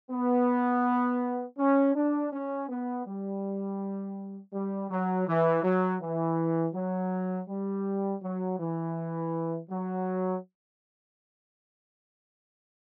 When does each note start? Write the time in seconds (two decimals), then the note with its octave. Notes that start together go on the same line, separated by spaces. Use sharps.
0.10 B3
1.58 C#4
1.95 D4
2.32 C#4
2.68 B3
3.06 G3
4.53 G3
4.90 F#3
5.27 E3
5.63 F#3
6.01 E3
6.74 F#3
7.48 G3
8.22 F#3
8.59 E3
9.70 F#3